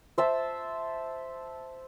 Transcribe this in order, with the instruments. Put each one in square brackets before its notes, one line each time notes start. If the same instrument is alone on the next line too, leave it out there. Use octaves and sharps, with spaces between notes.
[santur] C5 E5 A5